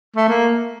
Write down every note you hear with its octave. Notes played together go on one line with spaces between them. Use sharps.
A3
A#3